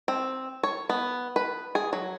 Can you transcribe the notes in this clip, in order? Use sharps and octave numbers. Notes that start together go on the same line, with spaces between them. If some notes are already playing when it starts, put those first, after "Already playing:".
C4
C#5
B3
B4
G#4
F#3